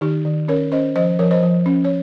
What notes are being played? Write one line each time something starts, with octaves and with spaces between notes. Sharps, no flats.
D#3 D#4 G4
D#3
C#4 A#4 C#5
C#4 C5 D#5
F3 C5 D#5
F3 A#4 C#5
C5 D#5
F3
C#4
C#5